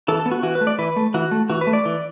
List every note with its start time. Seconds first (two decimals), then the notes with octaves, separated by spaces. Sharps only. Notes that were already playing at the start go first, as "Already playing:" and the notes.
0.08 E3 A4
0.20 A4
0.26 B3
0.32 F#4
0.43 E3 F#4
0.55 B4
0.61 A3
0.67 D5
0.79 E3 B4
0.96 A3
1.14 E3 F#4
1.31 A3
1.49 E3 F#4
1.61 B4
1.67 A3
1.73 D5
1.85 E3